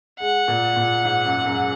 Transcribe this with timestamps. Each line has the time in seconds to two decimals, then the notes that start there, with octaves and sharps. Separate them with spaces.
0.20 G#3 F#5
0.48 A#2
0.76 A#2
1.04 G#2
1.25 F#2
1.46 F#2